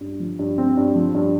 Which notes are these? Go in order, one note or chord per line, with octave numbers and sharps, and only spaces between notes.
G2
F3
G2
C4
G2
F3
G2